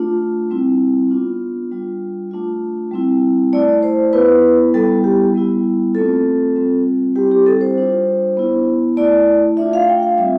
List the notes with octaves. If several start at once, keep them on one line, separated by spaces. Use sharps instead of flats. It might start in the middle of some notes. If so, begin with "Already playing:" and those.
Already playing: A3 D4 F4
G3 C4 E4
B3 D4 F4
G3 D4 F4
A3 D4 F4
G3 C4 E4
A3 E4 D5
C5
B3 E4 B4
G3 B3 E4 A4
G4
G3 B3 E4
A3 C4 F4 A4
G3 C4 F4
G3 C4 E4 G4
G4
A4
C5
G3 D4 F4
B3 E4
A3 E4 D5
A3 D4 F4 E5
F5
G5
F5
G3 C4 F4 E5